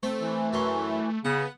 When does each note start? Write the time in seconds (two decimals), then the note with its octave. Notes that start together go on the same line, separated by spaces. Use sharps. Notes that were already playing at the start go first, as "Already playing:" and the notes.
0.03 A3 C4 C5
0.20 E3
0.53 F#2 C#4 C6
1.25 C#3 B3 F#5